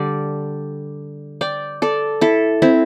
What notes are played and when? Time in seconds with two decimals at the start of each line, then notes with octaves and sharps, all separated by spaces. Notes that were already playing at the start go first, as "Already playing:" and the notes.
Already playing: D3 G3 D5
1.41 D5 G5
1.82 A4 D5
2.21 E4 A4
2.62 C4 E4